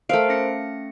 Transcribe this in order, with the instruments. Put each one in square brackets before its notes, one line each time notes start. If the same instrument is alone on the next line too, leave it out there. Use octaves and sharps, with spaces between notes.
[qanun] A3 F5 [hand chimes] A#4 C5 D7
[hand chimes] C#4 A#6 C#7